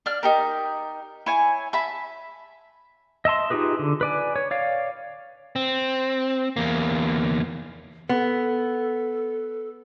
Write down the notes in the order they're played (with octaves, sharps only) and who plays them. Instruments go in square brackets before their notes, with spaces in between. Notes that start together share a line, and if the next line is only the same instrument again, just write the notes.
[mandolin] D4 F6
D#4 G4 A#4
E4 C#5 G#5
E5 A5 B5
[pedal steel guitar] D#5 E5 A5 C6
D#4 F4 G4 G#4 B4
D3
B4 D5 G#5
C#5
C#5 D5 F5
[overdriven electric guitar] C4
E2 A#3
[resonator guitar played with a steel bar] B3 [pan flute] A4